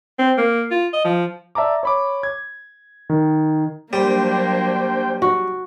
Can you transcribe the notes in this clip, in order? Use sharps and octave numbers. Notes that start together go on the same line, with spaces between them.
C4
A#3
F4
D#5
F3
D5 E5 A5 A#5 D6
C#5 B5 D6
G#6
D#3
F#3 G3 A#3 D4 C5 G5
F#4